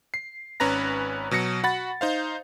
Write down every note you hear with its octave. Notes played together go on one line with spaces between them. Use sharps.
C7
G#1 C#4 B4 A#5 A#6
B2 F#3 A#6 C#7
F#4 F#5 B5 A6
D#4 C5 F5